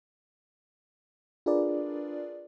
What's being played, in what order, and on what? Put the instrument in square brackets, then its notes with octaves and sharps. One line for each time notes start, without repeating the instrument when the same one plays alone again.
[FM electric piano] D4 F4 G#4 A#4 B4 D5